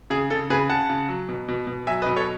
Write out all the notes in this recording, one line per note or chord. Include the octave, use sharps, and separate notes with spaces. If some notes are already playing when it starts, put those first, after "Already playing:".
C#3 G#4
C#3 A4
C#3 G#4 B4
C#3 F#5 A5
C#3
F#3
B2
B2
B2
F#3 E5 G#5
B4 D#5
B2
A4 C#5